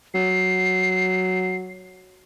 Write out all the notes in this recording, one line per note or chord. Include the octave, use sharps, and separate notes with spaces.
F#3 C7